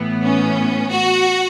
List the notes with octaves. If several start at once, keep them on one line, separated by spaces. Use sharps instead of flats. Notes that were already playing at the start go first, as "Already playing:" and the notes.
Already playing: A2 E3 B3
C#4
F#4